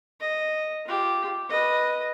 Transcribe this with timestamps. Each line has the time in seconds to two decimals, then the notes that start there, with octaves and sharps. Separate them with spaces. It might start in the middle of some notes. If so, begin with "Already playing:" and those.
0.21 D#5
0.86 F4 G4
1.49 B4 D#5